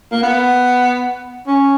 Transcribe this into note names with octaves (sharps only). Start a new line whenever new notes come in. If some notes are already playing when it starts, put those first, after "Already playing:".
A#3
B3
C#4